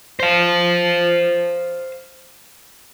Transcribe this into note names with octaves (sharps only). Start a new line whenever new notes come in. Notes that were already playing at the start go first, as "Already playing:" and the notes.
C5 F5